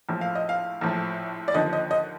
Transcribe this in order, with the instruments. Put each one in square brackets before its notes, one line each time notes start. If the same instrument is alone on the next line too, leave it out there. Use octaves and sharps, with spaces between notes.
[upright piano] A#1 A2 F3
F5
D#5
F5
A#1 A2 F3
D5
D#2 D3 F3 D#5
D#5
D#5